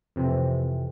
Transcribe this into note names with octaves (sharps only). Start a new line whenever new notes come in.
F2 C3 E3 C4